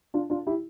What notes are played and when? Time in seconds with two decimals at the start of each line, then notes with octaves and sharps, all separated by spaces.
0.14 D4 F4
0.30 D4 F4
0.47 E4 G4